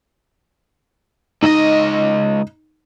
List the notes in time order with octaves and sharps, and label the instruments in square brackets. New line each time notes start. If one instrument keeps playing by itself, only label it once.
[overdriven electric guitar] C#2 D#5 [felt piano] D#4